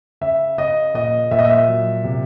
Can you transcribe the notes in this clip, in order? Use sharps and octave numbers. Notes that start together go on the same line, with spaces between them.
C#3 E5
C#3 D#5
A#2 D#5
A#2 E5
D#5
E5
F#3
C3